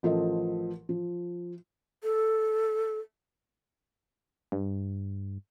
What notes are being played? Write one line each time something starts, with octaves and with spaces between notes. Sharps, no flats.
A1 F3 A4 A#4 D#5
F3
A4
G2